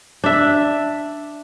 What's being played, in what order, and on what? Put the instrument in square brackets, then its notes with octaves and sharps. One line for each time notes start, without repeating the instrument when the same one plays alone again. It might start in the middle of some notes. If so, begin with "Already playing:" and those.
[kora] D4 E5